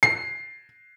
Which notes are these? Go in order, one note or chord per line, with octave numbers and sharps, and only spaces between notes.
C7